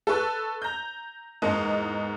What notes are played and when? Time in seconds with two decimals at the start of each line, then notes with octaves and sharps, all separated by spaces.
0.07 A4 B4 C#6 F#6
0.62 A#5 G6
1.42 E2 G#2 A#3 D#5